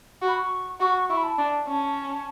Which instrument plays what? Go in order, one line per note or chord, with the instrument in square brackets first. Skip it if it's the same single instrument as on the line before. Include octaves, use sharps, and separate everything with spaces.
[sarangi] F#4
[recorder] B5
C#6
[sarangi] F#4 [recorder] C#6
[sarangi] E4 [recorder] C#6
[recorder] B5
A5
[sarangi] D4
C#4